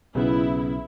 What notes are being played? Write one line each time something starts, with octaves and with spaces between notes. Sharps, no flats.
B1 C#3 B3 E4